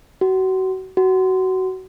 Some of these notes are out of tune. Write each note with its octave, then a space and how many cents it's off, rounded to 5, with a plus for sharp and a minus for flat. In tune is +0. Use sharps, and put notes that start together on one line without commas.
F#4 +30
F#4 +20